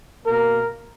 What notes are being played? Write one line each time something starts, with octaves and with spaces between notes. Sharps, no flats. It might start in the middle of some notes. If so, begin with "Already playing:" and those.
B2 A#3 A#4